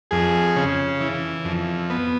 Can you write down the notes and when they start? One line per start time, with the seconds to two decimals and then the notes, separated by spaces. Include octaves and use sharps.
0.11 F2 G#4
0.56 C#3
1.01 E3
1.45 F2
1.90 B3